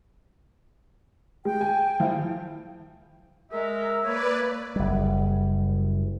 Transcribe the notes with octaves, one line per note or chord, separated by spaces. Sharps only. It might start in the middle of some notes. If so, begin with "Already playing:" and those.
G#3 G5
G#5
F3 E4 F4
G#3 A#4 E5
A#3 B4 C#5 D5
F#1 G3